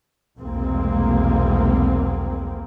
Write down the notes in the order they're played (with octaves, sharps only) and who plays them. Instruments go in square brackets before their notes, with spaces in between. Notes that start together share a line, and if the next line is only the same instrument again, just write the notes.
[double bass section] F1 B1 E2 G#3 A#3 C4